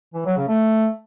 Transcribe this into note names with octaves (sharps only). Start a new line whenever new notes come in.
E3
F#3
C#3
A3